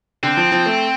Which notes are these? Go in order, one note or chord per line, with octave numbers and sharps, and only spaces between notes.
D3 C4
F3
F3
A3